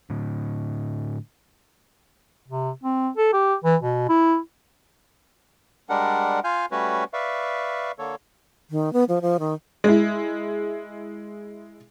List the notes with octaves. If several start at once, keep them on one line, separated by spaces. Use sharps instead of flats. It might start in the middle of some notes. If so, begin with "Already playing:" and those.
A2 D3
C3
C4
A4
G4
E3
B2
E4
G3 G#3 D4 A#4 F#5
F4 F5 G#5 F6 G6
G3 A3 C#4 F#4 B4 C#5
B4 D5 E5 F5 C#6
D3 A#3 A4 C#5
D#3
B3
F3
F3
D#3
G#3 E4